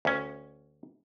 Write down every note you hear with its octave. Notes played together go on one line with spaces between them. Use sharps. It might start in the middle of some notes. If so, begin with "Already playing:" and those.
D2 C#4